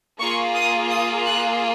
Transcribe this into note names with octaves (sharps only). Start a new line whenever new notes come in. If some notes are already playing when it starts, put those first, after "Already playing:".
A#3 F4 G#4 C#6
D#6
D#6
F#6